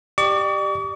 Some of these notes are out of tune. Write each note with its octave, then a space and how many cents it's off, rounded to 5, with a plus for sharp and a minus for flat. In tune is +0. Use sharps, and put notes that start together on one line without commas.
G4 +0 D5 +35 C#6 +45